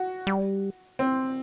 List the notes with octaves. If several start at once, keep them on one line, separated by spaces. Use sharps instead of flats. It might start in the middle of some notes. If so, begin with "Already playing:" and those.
Already playing: F#4
G3
C4